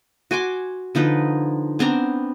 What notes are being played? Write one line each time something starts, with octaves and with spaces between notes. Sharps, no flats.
F#4 G#5 C6 D6
D3 F3 D#4 B4
B3 C4 D4 A#5